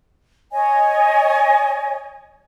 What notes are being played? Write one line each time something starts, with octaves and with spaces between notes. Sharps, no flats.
C#5 D#5 G#5